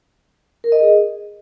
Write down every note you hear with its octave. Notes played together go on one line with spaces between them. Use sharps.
A#4
D#5
G#4